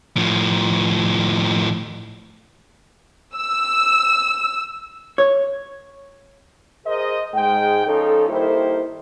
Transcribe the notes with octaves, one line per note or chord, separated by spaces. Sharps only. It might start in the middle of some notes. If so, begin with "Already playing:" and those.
A2 F3
E6
C#5
G#4 A#4 C5 D#5
G#2 G#3 G5
F3 C#4 D#4 A4
D#3 G3 A#3 E4 A4 C5